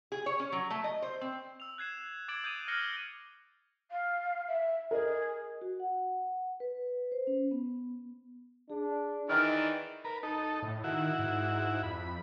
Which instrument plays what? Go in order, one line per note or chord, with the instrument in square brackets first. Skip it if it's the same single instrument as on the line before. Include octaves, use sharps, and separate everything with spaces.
[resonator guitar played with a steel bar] G#4
C#5
C#4
F#3
A3
D#5
C5
C4
[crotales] E6 F7
F#6 G#6 C7 E7
D6 G#6 A6 D7 E7 F#7
D#6 G6 G#6 D7 D#7 F7
F6 F#6 A#6 C7 C#7 G7
[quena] F5
E5
[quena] G#4 [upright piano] A#4 D#5
[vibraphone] F#4
F#5
B4
C5
C#4
B3
[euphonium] D4 [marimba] G#4
[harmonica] D#3 E3 D5 [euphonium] D#4 [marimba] F6
[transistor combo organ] A#4 B4
D#4 A4
[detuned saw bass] A2
[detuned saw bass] D#3 [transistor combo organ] E4 F#4
[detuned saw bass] G#2
[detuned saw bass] F2 [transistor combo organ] B5